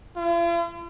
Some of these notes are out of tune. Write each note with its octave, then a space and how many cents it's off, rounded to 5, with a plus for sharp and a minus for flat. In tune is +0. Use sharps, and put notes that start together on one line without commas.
F4 -45